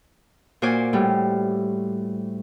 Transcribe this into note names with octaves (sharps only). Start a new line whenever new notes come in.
A#2 F#4 C5 D5 G#5 D6
A2 G3